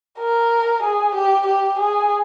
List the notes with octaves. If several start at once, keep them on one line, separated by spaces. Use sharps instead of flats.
A#4
G#4
G4
G4
G#4